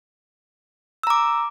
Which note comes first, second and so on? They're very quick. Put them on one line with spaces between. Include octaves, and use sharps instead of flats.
E6 A#5 D6